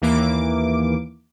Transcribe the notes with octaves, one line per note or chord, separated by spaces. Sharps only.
D#2 E3 A#3 D6